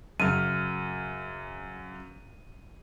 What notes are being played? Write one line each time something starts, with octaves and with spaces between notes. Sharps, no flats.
F#2 C#3 F6 D#7